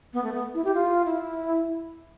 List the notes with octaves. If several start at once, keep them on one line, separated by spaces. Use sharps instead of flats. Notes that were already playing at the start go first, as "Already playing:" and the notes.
B3
A3
B3
E4
G4
F4
E4